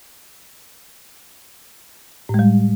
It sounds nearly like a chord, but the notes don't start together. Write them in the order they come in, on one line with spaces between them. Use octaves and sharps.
A2 G#3 G3